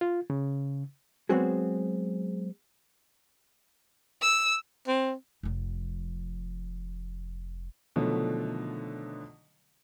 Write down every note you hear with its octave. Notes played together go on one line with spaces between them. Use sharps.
F4
C#3
F#3 G#3 B3 C4 F#4 G#4
E6
C4
F1 F3
B2 D3 D#3 F3 F#3 A3